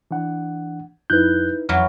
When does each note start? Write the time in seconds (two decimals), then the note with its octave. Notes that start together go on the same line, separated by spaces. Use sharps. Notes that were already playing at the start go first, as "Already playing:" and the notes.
0.11 E3 D4 F#5
1.10 F2 D#4 E4 B4 F#6 G6
1.69 F2 E3 F#3 F6